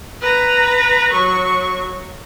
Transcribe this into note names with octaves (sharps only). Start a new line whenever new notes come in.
B4 A#5
F#3 C#6